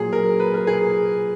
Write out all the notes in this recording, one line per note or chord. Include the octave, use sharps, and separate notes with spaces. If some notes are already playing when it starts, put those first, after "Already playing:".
Already playing: A#2 F#3 G#4
A#4
B4
A#4
G#4